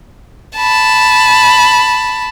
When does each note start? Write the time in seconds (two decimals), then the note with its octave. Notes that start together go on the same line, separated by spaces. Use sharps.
0.57 A5 B5